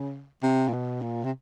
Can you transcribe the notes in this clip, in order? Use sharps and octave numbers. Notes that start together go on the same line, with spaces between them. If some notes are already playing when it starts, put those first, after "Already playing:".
Already playing: C#3
C3
A#2
B2
A#2
C3